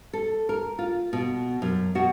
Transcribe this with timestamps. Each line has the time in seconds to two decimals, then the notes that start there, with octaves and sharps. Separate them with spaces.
0.13 A4
0.49 A#4
0.79 F4
1.13 B2
1.62 F#2
1.95 B2 F#4